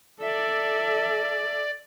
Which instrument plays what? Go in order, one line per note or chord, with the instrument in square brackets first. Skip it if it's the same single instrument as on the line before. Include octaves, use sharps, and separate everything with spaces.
[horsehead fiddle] A4 E5 [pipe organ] D5